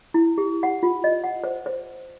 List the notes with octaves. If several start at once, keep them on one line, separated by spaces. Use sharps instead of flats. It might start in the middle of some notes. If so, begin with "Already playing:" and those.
E4
G4
F#5
F4
D#5
F#5
C5
C5